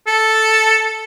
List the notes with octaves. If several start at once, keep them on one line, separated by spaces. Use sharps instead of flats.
A4